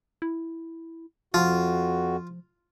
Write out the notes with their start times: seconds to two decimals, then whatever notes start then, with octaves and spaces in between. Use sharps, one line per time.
0.22 E4
1.34 F2 F3 F4 F#4